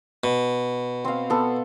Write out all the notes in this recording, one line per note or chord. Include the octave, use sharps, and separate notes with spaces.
B2
C4 F5
B3 A4